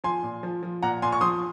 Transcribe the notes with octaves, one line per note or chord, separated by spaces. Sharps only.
F3 G#5 C6
A#2
F3
F3
A#2 F#5 A#5
A#2 G#5 C6
C#6
F3 C6 D#6